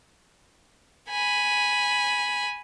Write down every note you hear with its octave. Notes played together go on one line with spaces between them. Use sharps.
G#5 B5